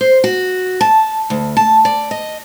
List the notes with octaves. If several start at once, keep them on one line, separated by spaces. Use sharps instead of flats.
C5
F#4
A5
D2
A5
D5
D#5